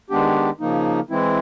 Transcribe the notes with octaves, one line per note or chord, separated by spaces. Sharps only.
D#3 G#3 B3 D4 G4
C#3 F3 A#3 D#4
E3 G#3 C4 E4